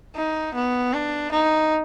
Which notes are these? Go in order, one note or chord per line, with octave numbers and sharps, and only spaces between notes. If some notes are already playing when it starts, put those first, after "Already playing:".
D#4
B3
D4
D#4